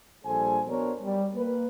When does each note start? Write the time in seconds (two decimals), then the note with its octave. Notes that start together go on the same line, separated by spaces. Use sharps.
0.25 A#1 G3 A4 C5 G#5
0.67 B3 D4 F#4 A#4 C5 C#5
1.03 G3
1.35 A#3 B4